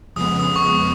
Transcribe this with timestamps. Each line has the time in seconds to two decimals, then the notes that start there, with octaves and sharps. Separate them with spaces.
0.16 F2 C#3 F3 G#3 B3 D#6
0.39 D#6
0.56 C#6
0.63 D#6